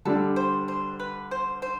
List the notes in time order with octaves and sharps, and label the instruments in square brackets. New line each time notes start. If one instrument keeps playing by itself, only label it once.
[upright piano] D3 G3 D4 [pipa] A4
[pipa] C5
C5
B4
C5
C5